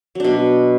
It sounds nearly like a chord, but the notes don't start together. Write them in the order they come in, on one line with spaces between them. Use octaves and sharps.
F#3 D4 B2